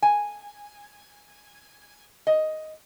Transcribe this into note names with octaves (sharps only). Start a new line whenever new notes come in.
G#5
D#5